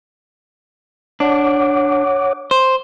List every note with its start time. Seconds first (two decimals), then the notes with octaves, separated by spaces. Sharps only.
1.20 D4 C#5 F#5 D6
2.51 C5